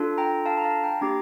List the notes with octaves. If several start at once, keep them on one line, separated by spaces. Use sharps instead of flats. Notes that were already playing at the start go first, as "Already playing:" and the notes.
Already playing: D4 F4 A4
G5 A#5
F5 A5
A#5
F5 A5
G5 A#5
A#3 D4 G4 A#5 D6